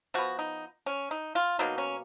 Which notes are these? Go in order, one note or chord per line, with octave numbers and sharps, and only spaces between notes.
F3 B3 F#4
D#4
C#4
D#4
F4
B2 F#3 A#3 D#4
C#4